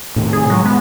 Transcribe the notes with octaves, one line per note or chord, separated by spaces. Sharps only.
A2 C3 D#3
G#4
F#3 G#3
B3